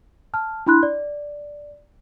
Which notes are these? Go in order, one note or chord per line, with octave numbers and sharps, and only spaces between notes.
A5 F6
D4 E4 B5 C6 F#6
D5